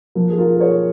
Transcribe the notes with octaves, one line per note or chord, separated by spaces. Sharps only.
F3 A#3
G#4
F4 A#4
A#4
G#4 C#5